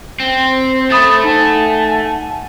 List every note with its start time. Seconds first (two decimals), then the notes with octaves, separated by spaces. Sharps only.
0.20 C4 C5
0.91 A3 B5 D#6 A6
1.24 D#4 F#5 G#5 A5